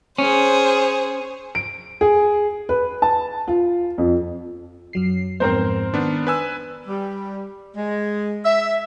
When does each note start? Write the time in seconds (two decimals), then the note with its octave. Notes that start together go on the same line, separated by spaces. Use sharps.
0.19 C#4 G#4 C5
1.55 D7
2.01 G#4
2.69 B4
3.02 A5
3.48 F4
3.98 F2
4.93 F#2 F#3 C7
5.40 F2 G#2 B3 C4 A#4 C5
5.94 D#3 B3 D4
6.27 B4 G#5 E6
6.87 G3
7.75 G#3
8.45 E5